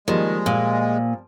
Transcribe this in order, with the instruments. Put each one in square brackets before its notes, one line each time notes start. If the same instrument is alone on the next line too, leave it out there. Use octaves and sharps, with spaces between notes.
[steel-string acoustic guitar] D#3 [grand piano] F3 G3 A#3 [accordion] G#3
[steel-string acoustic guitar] A#2